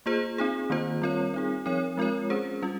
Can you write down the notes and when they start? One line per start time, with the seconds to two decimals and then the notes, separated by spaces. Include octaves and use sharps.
0.06 A#3 F4 G#4 C5
0.38 C4 D#4 G#4
0.70 D#3 A#3 F4 C5
1.02 G3 C4 F4 A#4 C#5
1.34 C4 D#4 G#4
1.66 F3 C4 D#4 A#4 C#5
1.97 G#3 C4 F4 A#4 C#5
2.30 C#4 G#4 C5
2.62 G3 C#4 F4